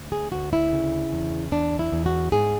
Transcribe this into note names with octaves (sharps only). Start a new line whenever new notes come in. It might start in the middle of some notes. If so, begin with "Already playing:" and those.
Already playing: D2
G#4
D2 F#4
E4
C#3
E2
E2 D4
E4
E2
F#4
G#2 G#4